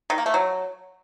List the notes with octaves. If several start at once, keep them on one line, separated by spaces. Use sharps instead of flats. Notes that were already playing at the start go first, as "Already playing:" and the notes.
D#3
A#3
A3
F#3